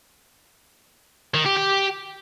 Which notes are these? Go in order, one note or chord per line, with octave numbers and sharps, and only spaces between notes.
D#3
G4
G4